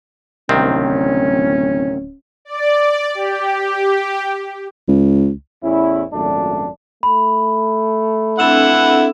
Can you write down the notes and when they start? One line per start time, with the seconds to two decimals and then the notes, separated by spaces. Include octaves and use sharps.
0.49 D1 C2 D#3 C4 C#4
2.45 D5
3.15 G4
4.88 C#2
5.63 A1 E2 C#4 E4
6.13 G#1 F#2 A#2 A3 D4
7.03 A3 B5
8.39 C4 D4 E4 A4 F#5 E6 E7